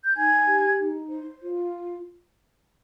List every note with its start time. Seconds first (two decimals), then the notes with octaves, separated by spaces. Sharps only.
0.04 G6
0.16 D#4 G#5 G#6
0.47 G4
0.78 D#4
1.08 C5
1.40 F4